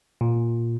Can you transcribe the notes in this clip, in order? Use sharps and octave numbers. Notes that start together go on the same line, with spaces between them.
A#2